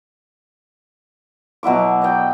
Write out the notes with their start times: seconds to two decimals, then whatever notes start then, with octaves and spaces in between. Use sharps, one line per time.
1.63 B2 F#3 E4 D6
2.02 D5 D#5 G5